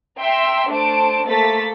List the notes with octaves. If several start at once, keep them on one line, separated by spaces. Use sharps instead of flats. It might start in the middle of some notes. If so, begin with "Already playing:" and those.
E5 G5 A#5 C6 E6
A3 D4 C5 A5 D7
A3 A#3 A4 C5 A6 B6